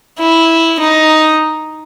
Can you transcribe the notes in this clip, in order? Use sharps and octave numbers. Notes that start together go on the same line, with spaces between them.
E4
D#4